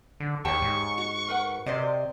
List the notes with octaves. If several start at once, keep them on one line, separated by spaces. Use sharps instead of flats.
D3
D#2 G4 C5 C#5 G5 A5 C#6
G#2
F#4
A#4 B4 F#5
C3 C5 D5 D#5